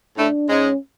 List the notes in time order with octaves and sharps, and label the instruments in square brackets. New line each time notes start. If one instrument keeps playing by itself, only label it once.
[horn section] A2 A3 [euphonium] D4
[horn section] G#2 G#3 [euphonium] C#4